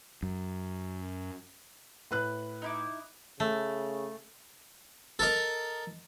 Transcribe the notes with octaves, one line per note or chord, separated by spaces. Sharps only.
F#2
A2 B4 F#6
D#4 E4 D6
C#3 A3
A4 A#4 D#5